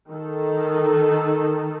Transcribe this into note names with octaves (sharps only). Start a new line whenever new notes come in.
D#3 A4